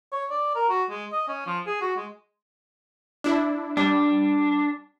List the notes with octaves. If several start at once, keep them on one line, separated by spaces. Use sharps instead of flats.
C#5
D5
A#4
F#4
G#3
D#5
C#4
F3
G#4
F#4
G#3
D4 E4
G3 D4